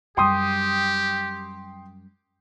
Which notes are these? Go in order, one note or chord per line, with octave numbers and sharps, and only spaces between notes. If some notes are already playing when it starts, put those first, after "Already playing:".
F#2 G3 G4 G5 C6 D#6